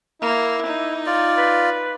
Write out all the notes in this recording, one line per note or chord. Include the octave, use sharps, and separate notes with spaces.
A#3 E4
D#4
F4 D5
B4